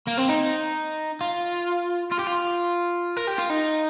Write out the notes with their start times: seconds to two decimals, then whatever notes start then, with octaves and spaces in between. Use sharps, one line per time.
0.08 A#3
0.18 C4
0.29 D#4
1.21 F4
2.12 F4
2.19 G4
2.27 F4
3.17 A#4
3.28 G4
3.39 F4
3.50 D#4